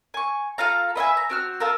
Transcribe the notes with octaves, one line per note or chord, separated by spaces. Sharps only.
G#5 C#6
F4 A4 F5 A#5
B4 D#5 E5 G#5
A#5
C4 F#4 F6
F4 A4 A#4